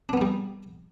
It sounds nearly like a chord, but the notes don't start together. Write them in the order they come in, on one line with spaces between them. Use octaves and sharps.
D4 B3 D#4 G3